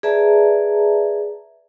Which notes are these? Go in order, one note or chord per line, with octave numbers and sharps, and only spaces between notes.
G#4 B4 D5 E5 A5 A#5